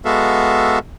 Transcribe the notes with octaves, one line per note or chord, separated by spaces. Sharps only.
G#3 B3 F#4 A4 E5 F5